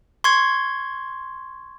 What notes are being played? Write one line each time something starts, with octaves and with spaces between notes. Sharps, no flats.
C6 C#6 G#6